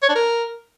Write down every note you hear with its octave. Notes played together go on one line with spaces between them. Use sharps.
C#5
D4
A#4